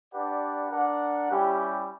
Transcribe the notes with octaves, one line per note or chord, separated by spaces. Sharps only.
D4 G4 B4 D5 F#5
D4 A#4 D5 F#5
G3 C#4 E4 G4